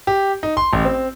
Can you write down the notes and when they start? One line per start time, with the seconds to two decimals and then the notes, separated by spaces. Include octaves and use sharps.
0.07 G4
0.43 D#4
0.57 C6
0.73 A1
0.85 C4